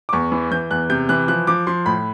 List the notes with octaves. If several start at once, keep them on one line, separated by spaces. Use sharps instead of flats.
D6
E2 C#6
E3
E3 G6
E2 F#6
C3 G6
E3 F#6
F3 F#6
F3 D6
F3 C6
A2 B5